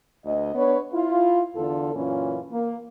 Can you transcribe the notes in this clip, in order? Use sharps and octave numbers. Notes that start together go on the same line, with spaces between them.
D2 D#5
B3 D4 B4 C#5
E4 F4
E2 D3 F4 A4
F#2 A#2 E3 C#4 F4
A#3